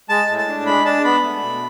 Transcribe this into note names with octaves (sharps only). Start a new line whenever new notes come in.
G#3 A5
A2
A5
D4
G#3 B5
D4 A5
B3 B5
A3
B2